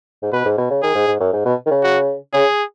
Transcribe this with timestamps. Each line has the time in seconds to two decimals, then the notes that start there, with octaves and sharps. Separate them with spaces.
0.23 G#2
0.33 B2 B4
0.45 G#2
0.58 B2
0.70 C#3
0.83 D#3 G#4
0.95 G#2
1.08 G#2
1.20 F#2
1.33 G#2
1.45 B2
1.66 D#3
1.71 C#3
1.84 F#4
2.33 C#3 G#4